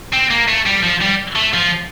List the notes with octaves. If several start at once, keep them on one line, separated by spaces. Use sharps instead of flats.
C4
A#3
A3
G3
F3
G3
A3
F3